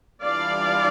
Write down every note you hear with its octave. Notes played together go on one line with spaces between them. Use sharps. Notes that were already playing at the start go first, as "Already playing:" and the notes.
E3 G3 D4 F4 D5 F5